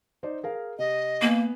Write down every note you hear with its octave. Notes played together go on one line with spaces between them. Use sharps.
D#4 C5 D5
G#4 A#4 F5
C3 D#5
A#3 B3 G#5